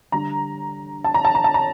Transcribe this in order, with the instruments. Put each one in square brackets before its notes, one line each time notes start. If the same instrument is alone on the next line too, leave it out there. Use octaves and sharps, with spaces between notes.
[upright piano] D3 G3 A#5
A5
A#5
A5
A#5
A5
A#5